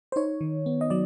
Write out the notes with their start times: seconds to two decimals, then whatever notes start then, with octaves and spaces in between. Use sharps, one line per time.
0.12 C5
0.16 D#4 C#5
0.41 D#3
0.66 B3
0.81 D#5
0.90 F#3 D5